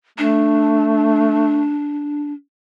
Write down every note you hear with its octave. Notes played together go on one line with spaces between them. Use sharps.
A3 D4